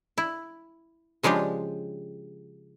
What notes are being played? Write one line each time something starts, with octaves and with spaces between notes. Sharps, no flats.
E4
C#3 F3 G#3 D4 G4